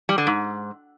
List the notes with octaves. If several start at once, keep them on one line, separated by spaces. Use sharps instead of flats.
G3
D3
G#2